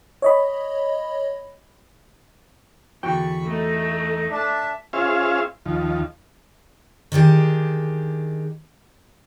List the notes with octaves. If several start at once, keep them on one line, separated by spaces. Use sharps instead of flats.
C#5 D#5 B5
E2 D3 F#4 G5 B5 C#6
A3 D#4
D4 E5 A5
C#4 F4 G#4 C5 E5 F5
D#2 F3
D#3 D4 G4 G#4